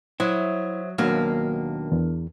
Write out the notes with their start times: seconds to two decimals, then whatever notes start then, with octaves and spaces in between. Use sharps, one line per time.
0.20 F#3 E4 C5 C#5 E5 D#6
0.98 D#2 B2 F#3 A#3 D4 A#4 F6
1.92 E2